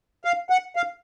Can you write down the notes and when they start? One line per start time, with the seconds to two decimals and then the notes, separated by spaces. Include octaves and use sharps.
0.25 F5
0.50 F#5
0.76 F5